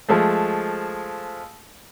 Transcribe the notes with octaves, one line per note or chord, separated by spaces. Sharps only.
F3 G#3 A3